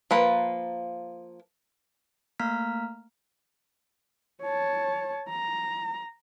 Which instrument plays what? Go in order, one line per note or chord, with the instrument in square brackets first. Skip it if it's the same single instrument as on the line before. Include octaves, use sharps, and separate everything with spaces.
[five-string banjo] F3 A#3 B4
[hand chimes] A3 A#3 F5 A#5 F6 B6
[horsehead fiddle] C#5 A5
A#5